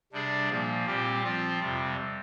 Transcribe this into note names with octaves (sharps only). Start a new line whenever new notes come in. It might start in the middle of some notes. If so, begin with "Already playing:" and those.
C3 G3 D4 G#4 D5
A#2 F3 A#3
A#2 G3 C4 G4
F3 C4 F4
F2 C3 G3